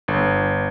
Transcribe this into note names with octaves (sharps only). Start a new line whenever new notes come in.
G1